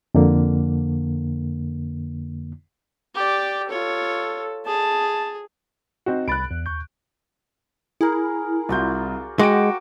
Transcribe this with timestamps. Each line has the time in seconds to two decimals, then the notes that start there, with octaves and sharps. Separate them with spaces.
0.15 F2 D3 A#3
3.15 G4 D5
3.69 F4 A4 C#5
4.67 G#4 A5
6.06 C4 D#4 F#4
6.28 C2 B5 F#6 A6 D7
6.51 E2
6.66 D#2 C#6 G6
8.01 E4 G#4 A#4
8.69 C2 F4 F#4 D5 G6
9.39 G#3 F#4 F#5 G5 D6 D7